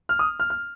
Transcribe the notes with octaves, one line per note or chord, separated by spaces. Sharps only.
F6
D#6
F6
F6